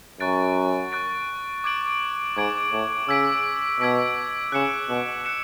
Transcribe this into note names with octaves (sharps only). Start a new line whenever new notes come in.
F#2 C#6 F#6 A6 D7
C#6 F#6 A6 D7
D6 G#6 D7 F#7
G#2 D6 G#6 D7 F#7
A2
C#3 E6 G#6 B6 D7
B2 E6 G#6 B6 D7
C#3 F#6 C#7 E7
B2
F#6 C#7 E7